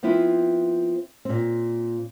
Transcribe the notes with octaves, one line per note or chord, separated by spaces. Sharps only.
F3 B3 C4 E4 F4
A#2 C4